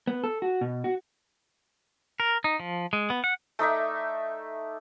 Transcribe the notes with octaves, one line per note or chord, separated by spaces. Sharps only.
B3
A4
F#4
B2
F#4
A#4
D#4
F3
G#3
B3
F#5
A3 D#4 D5 E5